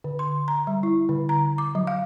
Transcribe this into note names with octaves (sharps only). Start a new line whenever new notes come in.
D3
C6
A#5
G3
E4
D3
A#5
D6
F#3
F5